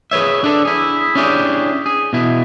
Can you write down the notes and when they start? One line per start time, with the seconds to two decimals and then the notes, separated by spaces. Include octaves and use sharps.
0.11 G#4 B4 C#5 E5
0.44 D4 A4
0.65 E4 G#4
1.15 C#4 D4 E4 G4 G#4
1.86 G#4
2.13 B2 E4